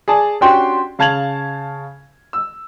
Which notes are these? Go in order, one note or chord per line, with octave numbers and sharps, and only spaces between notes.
G#4 D5 A5
C#4 D4 F#4 G4 G5 C6
C#3 F5 A5 G#6 F7 F#7
E6